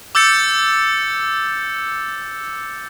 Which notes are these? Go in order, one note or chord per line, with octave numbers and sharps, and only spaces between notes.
D6 E6 G6 A6 C#7